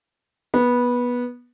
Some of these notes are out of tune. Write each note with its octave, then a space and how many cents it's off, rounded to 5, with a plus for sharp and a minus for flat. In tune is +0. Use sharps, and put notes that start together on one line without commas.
B3 -15